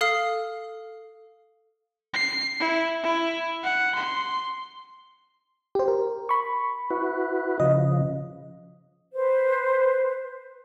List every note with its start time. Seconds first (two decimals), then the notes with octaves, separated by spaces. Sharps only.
0.01 A4 F5 D#6 F6 C7
2.14 C7
2.60 E4
3.03 E4
3.63 F#5
3.95 C6
5.75 G4 C5
5.88 A#4
6.29 B5 C#6
6.90 E4 F#4 B4
7.60 C#3 F3 D#5
9.14 B4 C5